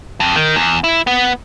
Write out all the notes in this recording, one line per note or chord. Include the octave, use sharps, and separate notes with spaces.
F2
D#3
E2
E4
B3